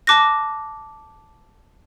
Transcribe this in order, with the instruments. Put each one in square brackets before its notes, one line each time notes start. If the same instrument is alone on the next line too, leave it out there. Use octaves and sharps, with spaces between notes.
[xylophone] A5 D6 F#6 A#6